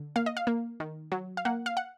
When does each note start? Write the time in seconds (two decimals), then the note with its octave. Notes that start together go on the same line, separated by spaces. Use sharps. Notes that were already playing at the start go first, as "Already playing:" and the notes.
Already playing: D3
0.16 A#3 F5
0.26 D#5
0.37 F5
0.47 A#3
0.80 D#3
1.12 F#3
1.37 F5
1.45 A#3 F#5
1.66 F5
1.77 F#5